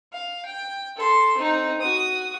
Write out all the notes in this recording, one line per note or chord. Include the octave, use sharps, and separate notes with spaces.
F5
G5
A4 C6
C4 D#4
F#4 D#6